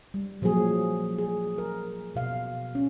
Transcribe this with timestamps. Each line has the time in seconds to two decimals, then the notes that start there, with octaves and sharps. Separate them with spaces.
0.14 G3
0.42 A#2 F3 F#3 A#3 G#4
1.19 G#4
1.58 A#4
2.15 B2 F5
2.75 C#4